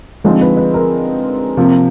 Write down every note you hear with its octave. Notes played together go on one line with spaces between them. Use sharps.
D3 F3 G#3 C4 D#4
B4
B4
A#4
C3 F3 A#3